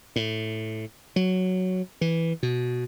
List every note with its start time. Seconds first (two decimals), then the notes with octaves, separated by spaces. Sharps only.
0.16 A2
1.16 F#3
2.01 E3
2.43 B2